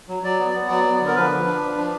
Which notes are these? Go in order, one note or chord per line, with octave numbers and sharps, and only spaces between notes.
F#3
F#3 D5
B3
B3
F#3 D5
B3
D3
A#4
F3 B4
F3
D4
F3
D4